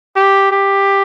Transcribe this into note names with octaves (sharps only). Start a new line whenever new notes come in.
G4
G4